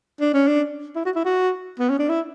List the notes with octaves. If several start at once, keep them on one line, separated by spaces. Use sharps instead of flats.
D4
C#4
D4
E4
F#4
E4
F#4
B3
C#4
D4
E4